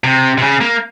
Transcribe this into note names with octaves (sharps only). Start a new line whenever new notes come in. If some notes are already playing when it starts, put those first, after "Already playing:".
C3
C3
C#3
A#3